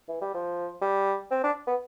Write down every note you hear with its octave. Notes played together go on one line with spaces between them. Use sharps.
E3
G3
F3
G3
C4
D4
B3